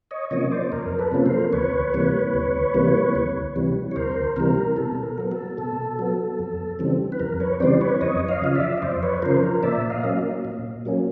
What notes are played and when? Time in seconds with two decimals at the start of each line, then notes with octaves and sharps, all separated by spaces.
0.11 C#5 D#5
0.31 C3 F3 A#3 C#4 C#5 D#5
0.52 C5 D5
0.72 F2 A#4
0.99 A4 B4
1.12 C3 F3 A#3 C#4
1.26 A#4 C5
1.53 D2 B4 C#5
1.94 C3 E3 G3 A#3
2.34 D2
2.74 C3 E3 G3 A#3
3.15 D2
3.56 C3 E3 G3
3.91 C#5
3.96 D2 A#4 C5
4.36 C3 E3 G3 A#4
4.76 B2 A4
5.03 A#4
5.18 F#3 B3
5.32 A4
5.58 B2 A4
5.99 F#3 B3
6.39 F2
6.79 C#3 E3 G3 C4
7.12 B4
7.20 F2 A#4
7.40 B4 C#5
7.60 C#3 E3 G3 C4 C5 D5
7.81 B4 C#5
8.01 F2 C#5 D#5
8.29 D#5 F5
8.42 C#3 F3
8.55 D5 E5
8.78 D#5
8.82 F2 C5 D5
9.03 B4 C#5
9.22 C#3 F3 A#4 C5
9.43 A#4
9.63 A#2 D5 E5
9.90 D#5 F5
10.03 F#3 A#3 C#4
10.45 A#2
10.85 F#3 A#3 C#4